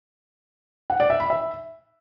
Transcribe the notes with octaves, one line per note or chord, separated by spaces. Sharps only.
F#5
D5
E5
B5
E5